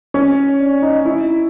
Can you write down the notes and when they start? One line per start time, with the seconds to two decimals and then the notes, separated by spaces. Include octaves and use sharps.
0.14 C#4
0.60 D4
0.82 D#4
1.05 E4